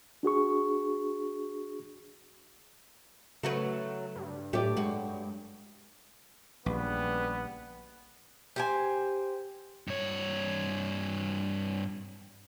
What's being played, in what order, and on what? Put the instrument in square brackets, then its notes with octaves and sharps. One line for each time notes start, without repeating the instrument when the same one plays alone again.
[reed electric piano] D4 F#4 G#4 C#6
[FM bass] C#3 [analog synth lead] F#3 [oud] A3 F#4 B4
[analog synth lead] G2
[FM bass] A2 [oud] A3 [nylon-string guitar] G4 D5
[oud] F#2 F#4 [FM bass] G#3
[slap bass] A#1 [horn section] C#3 G3 B4 [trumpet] B3
[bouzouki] G4 C5 G#5
[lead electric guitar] G2 C#5